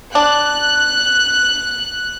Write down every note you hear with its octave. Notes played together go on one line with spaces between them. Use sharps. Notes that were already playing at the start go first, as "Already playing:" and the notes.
D4 F#6